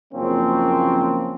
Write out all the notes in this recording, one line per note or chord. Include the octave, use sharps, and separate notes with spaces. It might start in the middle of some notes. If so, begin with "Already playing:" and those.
F#1 F3 A#3 C4 C#4